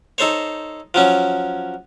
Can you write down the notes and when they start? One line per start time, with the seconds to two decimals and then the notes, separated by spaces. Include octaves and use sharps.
0.18 D#4 A4 C5 C#5
0.94 F3 F#3 C#4